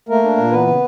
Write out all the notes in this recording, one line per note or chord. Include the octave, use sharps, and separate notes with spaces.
A3 A#3 A#4
D4
A#2
E3 B3 B4
C#3